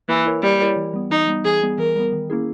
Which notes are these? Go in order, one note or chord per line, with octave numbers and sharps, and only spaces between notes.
E3 A#3
E4 A#4 C#5
G3 A#3
E4 A#4 C#5
E3
G3 B3
E3 D#4
G3 B3
E3 G#4
G3 B3
E3 A#4
G3 B3
D#3
A#3 C#4 E4 G#4